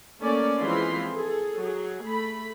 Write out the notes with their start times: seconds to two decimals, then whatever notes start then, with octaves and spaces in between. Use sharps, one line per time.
0.20 A3 A#3 C#4 A4 D5
0.60 E3 F3 G#3 C4 B5 C6
1.11 G#4 A4
1.57 F#3 G#4
2.04 A3 B5